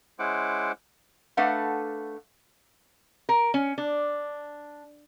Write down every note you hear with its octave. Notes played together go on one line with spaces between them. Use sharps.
G#3 C#4 E4 C5 F#5 D6
A3 D4 A4 B4 F5 F#5
A#4
C#4
D4